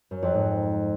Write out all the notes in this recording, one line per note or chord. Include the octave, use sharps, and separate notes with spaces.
F#2
F2
G#2